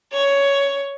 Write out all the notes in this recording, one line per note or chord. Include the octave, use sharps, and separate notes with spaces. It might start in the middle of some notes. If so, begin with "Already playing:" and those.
C#5